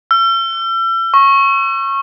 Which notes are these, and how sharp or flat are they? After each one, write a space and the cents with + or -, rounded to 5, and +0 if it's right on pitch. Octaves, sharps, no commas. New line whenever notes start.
E6 +40
C#6 -15